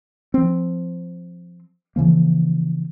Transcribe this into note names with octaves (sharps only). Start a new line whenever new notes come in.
F3 C4
C#3 E3 F3 A#3